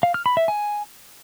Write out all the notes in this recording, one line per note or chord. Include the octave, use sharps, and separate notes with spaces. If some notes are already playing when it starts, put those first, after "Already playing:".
F5
F6
B5
E5
G#5